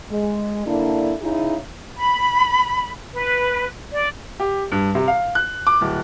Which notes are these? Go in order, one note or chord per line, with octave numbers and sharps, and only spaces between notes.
G#3
D3 A#3 D4 E4
C#3 D#4 E4 G#4
B5
B4
D5
G4
G2
C3
F5
F#6
D6
D1